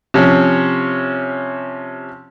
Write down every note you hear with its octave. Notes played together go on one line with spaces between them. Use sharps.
C3 F3 C#4